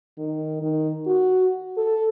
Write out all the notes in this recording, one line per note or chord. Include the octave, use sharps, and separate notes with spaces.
D#3
D#3
F#4
A4